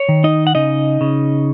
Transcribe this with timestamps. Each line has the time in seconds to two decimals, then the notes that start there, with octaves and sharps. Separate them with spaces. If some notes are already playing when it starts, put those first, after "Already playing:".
Already playing: C#5
0.09 D#3
0.24 D#4 D#5
0.47 F#5
0.55 C#3 D#4 D#5
1.01 C#3